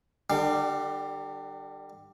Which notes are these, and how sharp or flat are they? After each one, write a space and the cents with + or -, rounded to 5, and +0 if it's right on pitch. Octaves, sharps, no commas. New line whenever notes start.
D3 +40 G3 +5